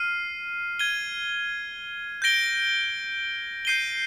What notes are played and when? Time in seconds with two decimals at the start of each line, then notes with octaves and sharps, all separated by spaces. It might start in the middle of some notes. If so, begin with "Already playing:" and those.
Already playing: F6 C7 D#7
0.79 G#6 D#7 G7
2.22 G6 A#6 D7 G7
3.65 G6 C7 D#7 G7